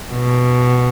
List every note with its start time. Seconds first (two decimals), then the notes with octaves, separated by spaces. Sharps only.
0.13 B2